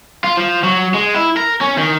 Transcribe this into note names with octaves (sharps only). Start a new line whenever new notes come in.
F4
F3
F#3
G#3
E4
A#4
C#4
D#3